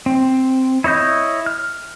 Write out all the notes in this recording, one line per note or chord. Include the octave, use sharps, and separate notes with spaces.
C4
E4 C#5 D#5 G6
F6